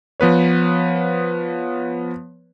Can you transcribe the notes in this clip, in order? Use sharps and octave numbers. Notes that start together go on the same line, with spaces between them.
F3 B3 B4 C#5